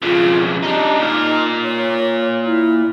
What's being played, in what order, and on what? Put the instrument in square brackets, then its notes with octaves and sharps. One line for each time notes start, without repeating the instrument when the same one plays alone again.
[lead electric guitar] F2 C#3 [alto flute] F4
[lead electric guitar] D4 D#4 [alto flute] G4
[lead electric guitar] A#2 A#4 [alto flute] D#4
[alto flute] C#5
E4